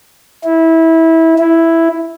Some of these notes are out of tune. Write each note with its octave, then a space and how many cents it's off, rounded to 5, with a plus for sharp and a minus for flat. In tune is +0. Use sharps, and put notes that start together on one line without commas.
E4 -20
E4 +0